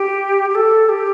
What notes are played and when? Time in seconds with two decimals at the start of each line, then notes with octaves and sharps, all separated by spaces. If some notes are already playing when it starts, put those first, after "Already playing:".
Already playing: G4
0.49 G4
0.55 A4
0.89 G4